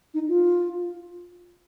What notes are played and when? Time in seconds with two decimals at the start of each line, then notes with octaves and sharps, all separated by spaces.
0.14 D#4
0.29 F4